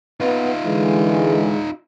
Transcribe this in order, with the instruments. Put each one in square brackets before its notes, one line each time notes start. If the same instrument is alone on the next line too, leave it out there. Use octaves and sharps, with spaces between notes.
[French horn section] B3 [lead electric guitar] D#4 F4
[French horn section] D3 E3 G#3